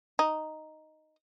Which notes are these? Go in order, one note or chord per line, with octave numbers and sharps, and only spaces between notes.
D#4